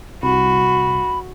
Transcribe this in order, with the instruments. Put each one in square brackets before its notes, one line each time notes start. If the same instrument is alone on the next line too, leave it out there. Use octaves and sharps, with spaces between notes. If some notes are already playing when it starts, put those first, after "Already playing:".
[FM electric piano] C2 [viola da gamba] F#4 [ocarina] B5